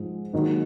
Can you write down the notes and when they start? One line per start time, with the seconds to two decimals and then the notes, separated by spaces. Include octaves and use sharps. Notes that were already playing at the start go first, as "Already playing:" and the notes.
Already playing: G#2 F3 G#3
0.33 G#2 D#3 F#3 A#3